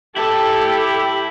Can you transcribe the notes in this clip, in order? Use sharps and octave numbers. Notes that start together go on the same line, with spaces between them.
E4 G4 A4 A5